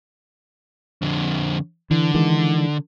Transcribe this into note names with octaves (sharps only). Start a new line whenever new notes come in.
F2 D3
D3 E3
D#3 E3 G#3